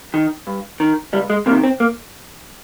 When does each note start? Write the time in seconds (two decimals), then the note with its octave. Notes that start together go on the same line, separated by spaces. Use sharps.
0.14 D#3
0.47 G2
0.80 D#3
1.13 C#2 G3
1.30 G#3
1.46 C3 A#3
1.51 D#3
1.64 C4
1.80 A#3